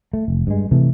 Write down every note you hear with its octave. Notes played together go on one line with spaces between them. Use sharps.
A3
F1
G2 G#3
C3 E3 A3